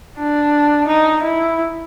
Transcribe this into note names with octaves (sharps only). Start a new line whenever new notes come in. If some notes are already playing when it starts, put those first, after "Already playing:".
D4
D#4
E4